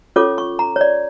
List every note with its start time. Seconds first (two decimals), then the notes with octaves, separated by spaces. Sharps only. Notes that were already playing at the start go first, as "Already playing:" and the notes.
0.16 C#4 F4 A4 C#5 D6
0.38 C#6
0.59 A#5
0.76 C#5
0.81 D5